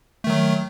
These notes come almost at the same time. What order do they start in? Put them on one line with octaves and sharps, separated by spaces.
A3 D#3 F#3